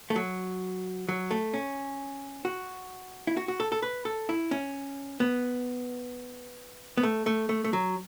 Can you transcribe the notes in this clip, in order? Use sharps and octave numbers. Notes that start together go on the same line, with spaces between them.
A3
F#3
F#3
A3
C#4
F#4
E4
F#4
F#4
A4
A4
B4
A4
E4
C#4
B3
B3
A3
A3
A3
A3
F#3